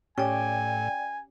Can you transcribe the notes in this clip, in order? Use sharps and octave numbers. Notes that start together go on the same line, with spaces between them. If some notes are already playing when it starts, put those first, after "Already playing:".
A2 C#4 G4 D5 G5 G#5